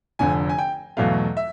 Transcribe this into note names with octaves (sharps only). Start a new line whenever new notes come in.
F1 F2 D3 G#5
G#5
G5
E2 B2 F#3 A3 F5
E5